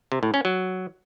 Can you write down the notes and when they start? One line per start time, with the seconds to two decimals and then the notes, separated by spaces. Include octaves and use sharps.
0.12 C3
0.23 A2
0.34 C#4
0.45 F#3